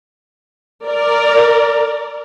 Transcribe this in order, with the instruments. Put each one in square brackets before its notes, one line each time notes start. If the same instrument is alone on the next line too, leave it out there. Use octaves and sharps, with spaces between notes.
[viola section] A#4 D5